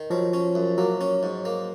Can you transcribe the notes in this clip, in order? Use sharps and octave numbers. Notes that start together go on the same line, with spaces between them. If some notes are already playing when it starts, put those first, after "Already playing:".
Already playing: D#3
F3 F#3
C#4
F#2
F#3 A#3
C#4
G#2
A#3